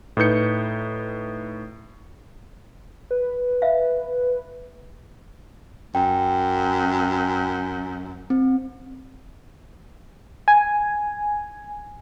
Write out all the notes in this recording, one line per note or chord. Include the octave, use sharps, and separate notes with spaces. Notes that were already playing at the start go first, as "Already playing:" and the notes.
A2 D#4 B4 G6 C#7
B4
E5 F5
F#2 G5
C4
G#5